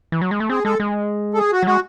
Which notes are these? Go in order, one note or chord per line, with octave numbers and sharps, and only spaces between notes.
E3
F#3
G#3
A3
C4 G#4
G#3 A4
G#3
A4
G#4
F#4
F#3
G#3 F#4